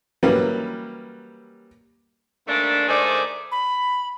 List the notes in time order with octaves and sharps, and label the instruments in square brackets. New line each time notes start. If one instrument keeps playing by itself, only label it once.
[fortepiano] E3 F#3 G3 A#3 C#4 B4
[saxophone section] G#2 A3 A#3 D4
D#3 A3 D4 G#4 C5 D5
[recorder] B5